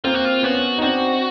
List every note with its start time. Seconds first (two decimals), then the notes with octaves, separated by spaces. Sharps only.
0.04 A#3 C4 F4
0.14 F#4
0.25 F4
0.43 B3 C#4 F#4
0.78 D#4
0.82 C4 D4 F#4